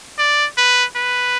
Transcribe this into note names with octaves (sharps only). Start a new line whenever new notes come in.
D5
B4
B4